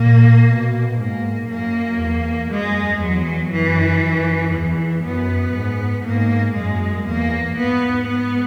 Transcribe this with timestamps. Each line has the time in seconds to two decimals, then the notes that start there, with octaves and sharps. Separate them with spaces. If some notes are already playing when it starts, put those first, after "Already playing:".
Already playing: A#2 A#3
0.48 B2
0.99 G#2 A#3
1.49 F#2 A#3
1.99 E2
2.50 F#2 G#3
3.01 E2 F#3
3.52 F#2 E3
4.02 F#2
4.52 E2 E3
5.03 F#2 B3
5.54 G#2
6.04 G#2 A#3
6.55 F#2 G#3
7.05 E2 A#3
7.56 G#2 B3
8.07 B3